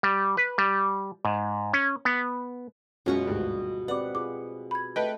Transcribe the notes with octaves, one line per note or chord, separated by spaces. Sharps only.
G3
B4
G3
G#2
C#4
B3
F#2 B2 G#3 C#4 F4 F#4 G#4 C#6
G#1 D2 G2
C4 G4 B4 D5 F#5 D6
F4 G#4 D6
B5 G#6
A3 B4 D#5 G5